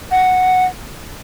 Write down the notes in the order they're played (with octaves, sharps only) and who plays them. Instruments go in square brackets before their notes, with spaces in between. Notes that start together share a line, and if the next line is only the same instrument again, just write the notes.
[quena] F#5